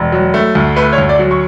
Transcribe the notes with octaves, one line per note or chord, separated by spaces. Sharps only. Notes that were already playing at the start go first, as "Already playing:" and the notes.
Already playing: E1
F#3
A3
D2
A3 B4
C#5
D2
D5
F#3
C#6